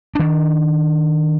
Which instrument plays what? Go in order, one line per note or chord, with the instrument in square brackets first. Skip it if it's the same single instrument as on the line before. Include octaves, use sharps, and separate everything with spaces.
[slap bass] D#3 D4